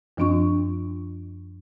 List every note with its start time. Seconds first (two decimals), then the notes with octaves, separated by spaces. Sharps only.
0.17 F#2 F3 C4 D4 F4 C#6